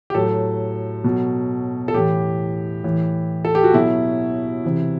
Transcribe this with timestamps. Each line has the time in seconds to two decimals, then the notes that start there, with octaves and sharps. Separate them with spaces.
0.10 G4
0.15 A2 F#3 A4
1.04 B2 F#3
1.88 A4
1.94 A2 E3 G4
2.84 A2 E3
3.45 A4
3.55 G4
3.64 F#4
3.74 B2 F#3 E4
4.64 C3 E3